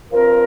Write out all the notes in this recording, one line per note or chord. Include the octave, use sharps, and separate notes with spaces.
G2 F3 C4 F4 A#4